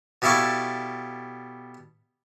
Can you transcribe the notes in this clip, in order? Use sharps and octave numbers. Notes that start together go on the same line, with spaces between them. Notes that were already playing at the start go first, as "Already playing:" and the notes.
B2 G3 E4 A4 F5 C#6